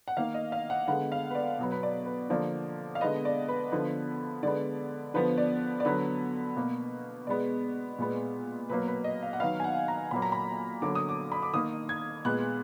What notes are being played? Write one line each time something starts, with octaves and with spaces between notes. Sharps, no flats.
F#5
D#3 A#3 F5
D#5
F5
F#5
D3 G#3 B3 F#5
F5
B4
D5
B2 F#3 B3
B4
D5
B4
D3 F3 A#3 D5
F5
D3 G#3 B3 D#5
D5
B4
D3 F3 B3
D3 G#3 B3 D5
D3 F3 B3 B4
D5
D5
D3 F#3 B3 B4
B2 A#3
B2 G#3 B3 D5
A#2 G#3 B3
B2 F#3 A#3 B4
B4
D#5
F5
F#5
D#3 F#3 B3 F5
G#5
F#5
A#5
A#2 F#3 A#3 B5
A#5
B5
D3 F#3 A#3 D6
D#6
D6
B5
D6
D#3 A#3 D#6
G#6
A#2 G#3 B3 F#6